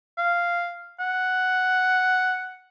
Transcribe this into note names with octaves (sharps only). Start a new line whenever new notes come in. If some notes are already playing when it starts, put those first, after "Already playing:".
F5
F#5